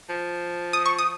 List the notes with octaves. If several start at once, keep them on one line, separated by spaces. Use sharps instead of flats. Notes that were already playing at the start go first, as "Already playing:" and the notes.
F3
D#6
C#6
D#6